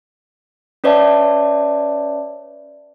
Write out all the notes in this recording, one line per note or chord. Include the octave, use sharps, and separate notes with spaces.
C#4 B4 C#5 D5 E5 A5